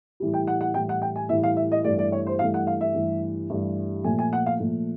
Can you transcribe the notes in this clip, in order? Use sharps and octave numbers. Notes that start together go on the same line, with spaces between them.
A2 E3 G3
G5
F#5
F#5
A2 E3 G3 G5
F#5
G5
G#5
A2 E3 G3 E5
F5
E5
D#5
G2 E3 A3 D5
D5
C#5
C5
G2 E3 A3 F5
F#5
F5
E5
G2 E3 A3
G2 E3 A3
A#2 F3 A3 G#5
G#5
F#5
F5
A#2 F3 A3